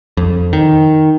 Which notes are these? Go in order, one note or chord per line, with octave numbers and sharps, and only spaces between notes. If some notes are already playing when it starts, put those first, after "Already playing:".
F2
D#3